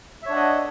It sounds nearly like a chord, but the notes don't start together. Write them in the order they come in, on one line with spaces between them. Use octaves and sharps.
E5 C#5 D4 F#5 D#5